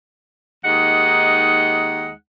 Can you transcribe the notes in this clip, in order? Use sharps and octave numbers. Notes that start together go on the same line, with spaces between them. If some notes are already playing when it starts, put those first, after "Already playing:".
D#2 G#3 D#4 F#5